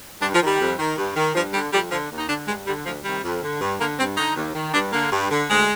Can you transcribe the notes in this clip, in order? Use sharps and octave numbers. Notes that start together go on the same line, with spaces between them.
G2 D4
F3
D#3
G3
F2
D#3
G2
D#3
G2 F3
D3 G3
F2 G3
D3 F3
D#2
D#4
D3 D4
G2 G#3
D3 G3
D2 F3
C3 D#3 G3
F2
D3
G2
D3 A#3
G2 C4
D3 D#4
D#2
D#3
G2 D4
D3 A#3
G2
D3
D2 G#3